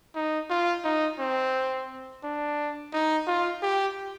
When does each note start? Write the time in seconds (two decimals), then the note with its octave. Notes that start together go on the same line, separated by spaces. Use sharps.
0.15 D#4
0.50 F4
0.84 D#4
1.19 C4
2.24 D4
2.93 D#4
3.27 F4
3.62 G4